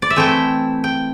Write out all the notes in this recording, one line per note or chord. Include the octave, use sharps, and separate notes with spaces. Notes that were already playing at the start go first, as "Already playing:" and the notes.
D5
E5
E3 A3 C4 E4 G5
G5